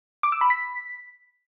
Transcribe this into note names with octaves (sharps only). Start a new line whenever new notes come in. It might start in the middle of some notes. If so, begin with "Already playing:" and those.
D6
E6
B5
B6